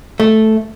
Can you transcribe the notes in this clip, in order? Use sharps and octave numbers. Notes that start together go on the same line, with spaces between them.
A3